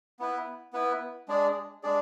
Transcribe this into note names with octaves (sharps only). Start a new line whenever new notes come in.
B3 E4 B4
B3 E4 B4
G#3 D4 G#4 D5
G#3 D4 G#4 D5